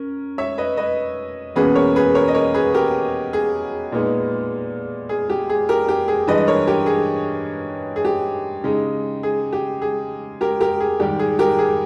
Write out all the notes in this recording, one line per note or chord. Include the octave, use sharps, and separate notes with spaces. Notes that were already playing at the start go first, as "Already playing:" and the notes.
Already playing: C#4 A#4
C#5 E5
B4 D#5
B4 D#5
E2 B2 A#3 C#4 G#4 B4
A#4 C#5
G#4 B4
A#4 C#5
D#5
A#4 C#5
G#4 B4
G4 A#4
G#4
A#2 G#3 B3 D#4
G#4
G4
G#4
G4 A#4
G4
G#4
G2 E3 G#3 B4 D#5
D#5
A#4 C#5
G4 A#4
G#4
G#4
G4
C#3 G#3 D#4
G#4
G4
G#4
G4 A#4
G4 A#4
G#4
G#2 D#3 G3 G4
G#4
G4 A#4
G#4